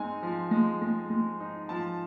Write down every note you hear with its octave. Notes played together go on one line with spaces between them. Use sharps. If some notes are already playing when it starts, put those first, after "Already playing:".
Already playing: G#3 C4 D#4 G#5
F3
G#3
G#3
G#3
D#4
F3 A5